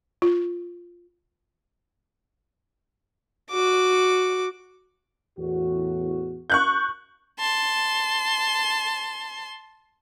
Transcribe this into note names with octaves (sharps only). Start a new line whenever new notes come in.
F4
F#4 D6
E2 A2 F#4
C#6 F#6 G6
A5 C6